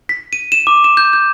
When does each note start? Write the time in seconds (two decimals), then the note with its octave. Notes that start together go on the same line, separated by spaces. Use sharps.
0.09 B6
0.33 D#7
0.52 E7
0.67 D6
0.84 E7
0.97 G6
1.13 G6